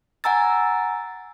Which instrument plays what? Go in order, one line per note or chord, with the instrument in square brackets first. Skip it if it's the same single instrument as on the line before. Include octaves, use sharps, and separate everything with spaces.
[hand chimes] F#5 G#5 A#5 E6 A6